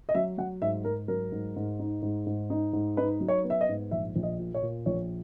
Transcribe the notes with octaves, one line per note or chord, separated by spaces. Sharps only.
D#5
F#3 E5
F#3 F#5
G#2 E5
G#2 A#4
F#3 A#4
G#2
G#2
D#4
G#2
G#2
D#4
G#2
D#4 B4
F#3
C#5
B3
E5
D#5
G#2
A#1 E5
A#1
D#5
A#2
C#5
A#2
A#1 C#5